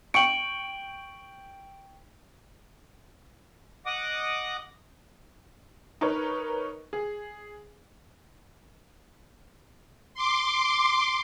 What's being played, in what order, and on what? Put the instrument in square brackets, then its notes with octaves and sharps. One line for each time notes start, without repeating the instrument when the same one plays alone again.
[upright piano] G5 C#6 C#7 [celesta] D7 F#7
[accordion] D#5 F#5 D6 D#6
[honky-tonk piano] D#4 A#4 B4 C#5
G#4
[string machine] C6 D6